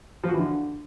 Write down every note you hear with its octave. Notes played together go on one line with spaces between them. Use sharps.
F3
F#4
E3
D3